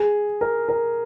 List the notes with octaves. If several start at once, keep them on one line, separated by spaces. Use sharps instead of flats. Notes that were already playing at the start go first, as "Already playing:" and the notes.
Already playing: G#4
A#4
A#4